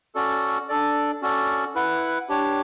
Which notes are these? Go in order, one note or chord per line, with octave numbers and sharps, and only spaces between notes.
C#4 F#4 A4 D5
D4 A4 D5
C#4 F#4 A4 D5
E4 B4 F#5
D4 G4 C#5